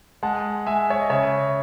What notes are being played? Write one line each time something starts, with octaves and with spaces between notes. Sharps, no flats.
G#3 F#5 A5
G#3 E5 G#5
C#5
D#5
C#3 C#5 E5